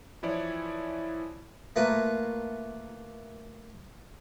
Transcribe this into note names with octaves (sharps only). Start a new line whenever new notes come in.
E3 F3 E4 C#5 D5
A3 A#3 F4 B4